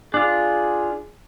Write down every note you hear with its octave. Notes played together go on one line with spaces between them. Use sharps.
D4 F4 G#4